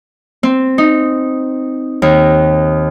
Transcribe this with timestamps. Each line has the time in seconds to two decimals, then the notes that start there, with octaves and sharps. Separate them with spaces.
0.43 C4
0.78 D#4
2.02 D#2